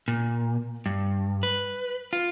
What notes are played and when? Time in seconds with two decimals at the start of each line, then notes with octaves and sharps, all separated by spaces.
0.08 A#2
0.86 G2
1.43 B4
2.13 F4